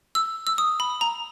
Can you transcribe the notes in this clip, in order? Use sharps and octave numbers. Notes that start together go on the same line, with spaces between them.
E6
E6
D#6
B5
A#5